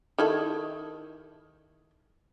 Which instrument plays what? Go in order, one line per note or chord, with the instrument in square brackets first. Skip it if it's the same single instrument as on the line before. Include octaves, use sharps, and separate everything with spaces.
[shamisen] D#3 E4 A4